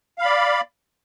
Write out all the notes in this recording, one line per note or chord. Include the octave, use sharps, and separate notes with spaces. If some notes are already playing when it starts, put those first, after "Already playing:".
D5 F5 B5